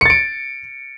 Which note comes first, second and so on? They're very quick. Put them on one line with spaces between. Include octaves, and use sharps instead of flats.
C#7 A6 D7